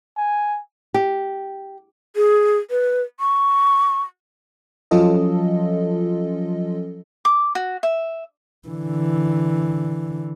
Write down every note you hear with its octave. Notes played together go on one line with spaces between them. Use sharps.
G#5
G4
G#4
B4
C#6
F3 F#3 C#4 F4 A4 D#5
D6
F#4
E5
D3 E3